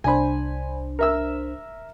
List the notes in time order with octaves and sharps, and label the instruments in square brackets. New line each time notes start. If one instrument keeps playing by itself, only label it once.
[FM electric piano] C2 D4 C5 [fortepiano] G#5 B5
[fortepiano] A#4 E5 E6